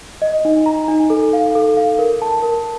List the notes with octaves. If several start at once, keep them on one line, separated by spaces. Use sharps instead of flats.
D#5
D#4
A#5
D#4
A4
F5
A4
F5
A#4
A5
A#4